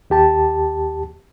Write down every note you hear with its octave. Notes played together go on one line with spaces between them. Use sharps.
D#2 G4 A5